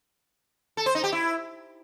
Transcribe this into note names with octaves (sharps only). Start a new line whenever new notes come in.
A4
C5
D#4
G4
E4